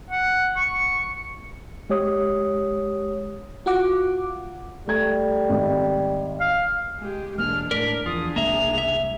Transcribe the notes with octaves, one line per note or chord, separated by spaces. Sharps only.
F#5
C#6
G#3 G4 C#5 D#6
F4 F#4 F#5 D6
G3 A3 G#6
G#1
F5
G#3 G4
E1 G#3 A#3 D4 F6
A2 D4 A#4 D5 B6
E2 F3 D4 F4 G#4 D#6
F#1 C2 G#3 A#3 E5 F7
E5